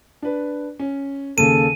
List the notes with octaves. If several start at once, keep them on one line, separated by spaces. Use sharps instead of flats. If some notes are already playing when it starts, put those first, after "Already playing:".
D4 B4
C#4
D#2 C#3 A#3 A4 D#7